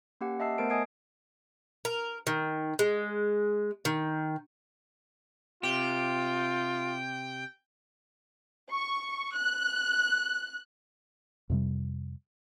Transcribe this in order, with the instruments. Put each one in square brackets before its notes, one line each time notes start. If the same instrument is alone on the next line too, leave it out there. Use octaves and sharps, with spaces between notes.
[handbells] A#3 C#4 G4 F#5
D#5 E5 F#5 A5 E6 C7
A3 B3 A#4 C5 A5 D7
D#5 G#5 D#6 G#6 C7 D7
[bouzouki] A#4
D#3
G#3
D#3
[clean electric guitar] C3 G4 [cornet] F4 [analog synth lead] G5
[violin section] C#6
F#6
[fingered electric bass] F2 C3 G3